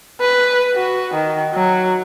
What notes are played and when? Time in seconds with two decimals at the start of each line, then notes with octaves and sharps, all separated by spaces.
0.21 B4
0.74 F#4
1.14 D#3
1.54 F#3